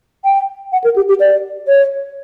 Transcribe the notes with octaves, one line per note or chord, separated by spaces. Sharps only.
G5
F#5
A#4
G4
G4
D5
C#5